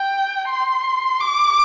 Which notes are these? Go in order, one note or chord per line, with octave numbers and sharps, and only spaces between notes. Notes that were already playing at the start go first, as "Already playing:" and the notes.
Already playing: G5
C6
D6